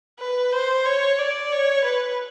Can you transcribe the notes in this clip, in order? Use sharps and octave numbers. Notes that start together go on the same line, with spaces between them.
B4
C5
C#5
D5
C#5
B4